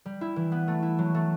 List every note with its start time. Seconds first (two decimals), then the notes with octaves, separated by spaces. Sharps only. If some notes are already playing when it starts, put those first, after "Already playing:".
0.06 G3
0.21 E4
0.36 E3
0.52 B3
0.68 A3
0.82 E4
0.99 F#3
1.15 A3